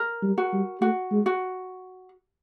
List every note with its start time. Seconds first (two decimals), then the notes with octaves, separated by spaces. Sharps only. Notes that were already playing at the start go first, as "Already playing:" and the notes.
Already playing: A#4
0.22 G3
0.38 F#4
0.52 G3
0.81 A3 F#4
1.12 G#3
1.26 F#4